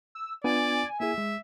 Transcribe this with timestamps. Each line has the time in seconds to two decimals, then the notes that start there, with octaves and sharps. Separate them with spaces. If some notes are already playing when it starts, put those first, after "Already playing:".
0.15 E6
0.44 B3 D4 F4 D5 G#5
1.00 A#3 E4 G#4 E5
1.18 G#3